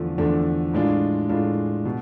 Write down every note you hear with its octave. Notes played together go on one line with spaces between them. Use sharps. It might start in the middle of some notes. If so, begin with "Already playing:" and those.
Already playing: E2 D3 F3 A3 D4
E2 D3 F3 A3 D4
A2 G#3 D4 F4
A2 G#3 D4 F4
B2